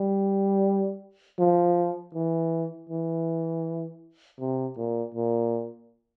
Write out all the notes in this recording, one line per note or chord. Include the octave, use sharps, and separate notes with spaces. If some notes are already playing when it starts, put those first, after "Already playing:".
Already playing: G3
F3
E3
E3
C3
A#2
A#2